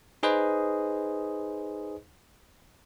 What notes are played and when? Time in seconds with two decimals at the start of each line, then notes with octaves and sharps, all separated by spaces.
0.23 D#4 G#4 B4 C5 D#5